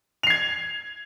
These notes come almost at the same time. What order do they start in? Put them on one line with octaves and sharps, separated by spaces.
F7 C7 G#6